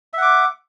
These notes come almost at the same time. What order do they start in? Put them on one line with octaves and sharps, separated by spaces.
E5 F#5 D6